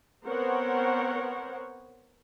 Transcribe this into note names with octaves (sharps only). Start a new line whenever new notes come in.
B3 C4 A#4 C5 C#5 F#5